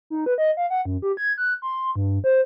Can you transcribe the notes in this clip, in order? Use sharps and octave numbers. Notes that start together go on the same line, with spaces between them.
D#4
B4
D#5
F5
F#5
F#2
G4
G#6
F#6
C6
G2
C5